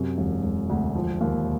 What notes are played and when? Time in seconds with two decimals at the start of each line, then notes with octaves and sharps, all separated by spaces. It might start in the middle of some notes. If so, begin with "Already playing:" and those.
Already playing: F#2 C3
0.18 E1
0.44 E1
0.70 D2
0.95 F3
1.21 D#2